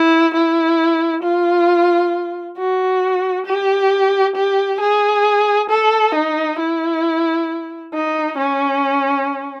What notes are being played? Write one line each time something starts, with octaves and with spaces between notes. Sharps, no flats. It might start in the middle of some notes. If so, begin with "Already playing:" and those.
Already playing: E4
E4
F4
F#4
G4
G4
G#4
A4
D#4
E4
D#4
C#4